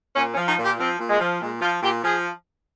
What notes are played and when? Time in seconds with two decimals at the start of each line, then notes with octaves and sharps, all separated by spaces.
0.16 A#2 C#4
0.32 C#4
0.37 F3
0.47 D#4
0.58 A#2 G4
0.78 F3 C4
0.99 A#2
1.09 G#3
1.19 F3
1.41 A#2 G#3
1.61 F3 F4
1.83 A#2 G4
2.03 F3 G#4